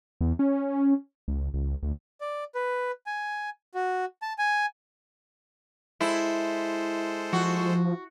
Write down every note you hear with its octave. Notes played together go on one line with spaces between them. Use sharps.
E2
C#4
C#2
C#2
D2
D5
B4
G#5
F#4
A5
G#5
G#3 E4 A4 C5
F3 F#4